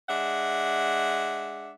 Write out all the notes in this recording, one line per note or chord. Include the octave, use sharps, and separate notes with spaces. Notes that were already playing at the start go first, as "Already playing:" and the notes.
G#3 D4 E5 F#5